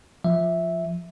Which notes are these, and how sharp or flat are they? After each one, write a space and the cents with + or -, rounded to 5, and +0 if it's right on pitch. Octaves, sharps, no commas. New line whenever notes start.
F3 +0 E5 -10